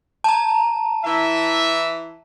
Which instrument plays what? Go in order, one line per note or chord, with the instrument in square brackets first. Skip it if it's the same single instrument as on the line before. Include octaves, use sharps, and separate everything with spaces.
[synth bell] A5 A#5
[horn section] E3 E4 E5